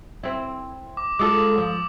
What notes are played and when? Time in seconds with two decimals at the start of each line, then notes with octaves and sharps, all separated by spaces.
0.23 C4 E4
0.97 D6
1.19 G#3 F4 A4 D6 E6
1.58 F3